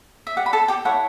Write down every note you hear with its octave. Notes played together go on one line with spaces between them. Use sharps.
E5
G4 D5 F#5
B5
A4 A5
G4 G5
E4 A4 C#5 F#5